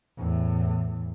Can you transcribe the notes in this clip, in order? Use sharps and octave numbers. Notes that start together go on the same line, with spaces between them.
E2 A2